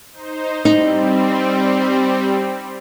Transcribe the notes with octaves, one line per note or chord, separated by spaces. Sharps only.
D#4 C5
G3 C4 D#4